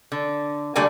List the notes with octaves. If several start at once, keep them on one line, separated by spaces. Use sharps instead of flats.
D3
D3 G3 A3 A#3 D5 G#5